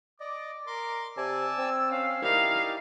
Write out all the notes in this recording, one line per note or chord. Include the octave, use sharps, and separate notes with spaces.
D5 D#5 D6
A#4 C6 D6
C3 D5 G#5 A5 E6
C4
C#4 F5
D#3 D#4 E4 G4 D5 F5